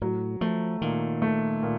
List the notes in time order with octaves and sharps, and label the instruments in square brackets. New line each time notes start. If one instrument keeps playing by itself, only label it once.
[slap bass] A2 [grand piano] F#3
[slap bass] F3 [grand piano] A3
[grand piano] A#2 [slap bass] D#3
[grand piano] A3
A#2